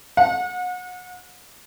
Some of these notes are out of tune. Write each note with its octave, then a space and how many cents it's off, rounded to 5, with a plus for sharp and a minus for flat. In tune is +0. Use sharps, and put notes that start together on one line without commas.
F#5 -40